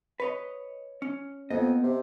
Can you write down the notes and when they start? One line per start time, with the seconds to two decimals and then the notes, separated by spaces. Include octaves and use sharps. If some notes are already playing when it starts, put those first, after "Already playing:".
0.20 B4 C#5 D#5
1.02 C#4
1.50 F2 A#3 B3 D#5
1.83 C3